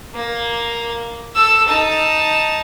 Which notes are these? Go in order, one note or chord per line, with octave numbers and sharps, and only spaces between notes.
A#3
A4 E6
D#4 A5